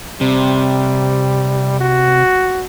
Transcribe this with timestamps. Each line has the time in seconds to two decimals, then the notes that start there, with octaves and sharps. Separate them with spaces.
0.21 C3 G3
1.81 F#4